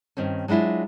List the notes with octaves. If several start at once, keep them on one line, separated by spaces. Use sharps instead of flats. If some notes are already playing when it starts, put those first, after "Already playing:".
G2 D#3 C4 C#4
F#3 G#3 D4 E4 F4